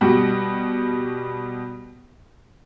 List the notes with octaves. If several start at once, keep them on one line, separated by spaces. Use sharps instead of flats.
B2 G3 F#4